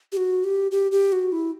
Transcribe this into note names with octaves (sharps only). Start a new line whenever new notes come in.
G4
F#4
G4
G4
G4
F#4
E4